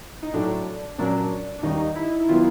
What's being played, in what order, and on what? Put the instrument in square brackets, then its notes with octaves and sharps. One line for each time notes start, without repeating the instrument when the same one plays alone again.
[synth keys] D#4
[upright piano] A2 F#3 A3 [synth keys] D4
[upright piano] A#2 F#3 A#3 C#4 [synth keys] D4
[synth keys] D4
[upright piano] D#2 D#3 G3 A#3 [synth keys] D#4
[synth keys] E4
E4
[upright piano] D#3 F#3 B3 [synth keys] F4